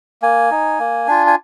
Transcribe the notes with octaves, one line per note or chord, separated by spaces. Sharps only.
A#3 G#5
D#4
A#3
D4 F4
G#5